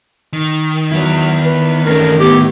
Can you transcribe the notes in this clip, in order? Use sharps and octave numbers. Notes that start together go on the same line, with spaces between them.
D#3
F#3 B3 E4
B4
E3 A3 C#4 D4 A#4
A3 B3 E4 G4